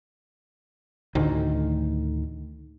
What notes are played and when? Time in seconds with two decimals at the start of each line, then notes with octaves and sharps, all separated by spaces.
1.15 D2 A2 D3 D#3